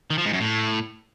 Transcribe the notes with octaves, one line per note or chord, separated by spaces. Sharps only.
D#3
F3
G#2
F#2
A2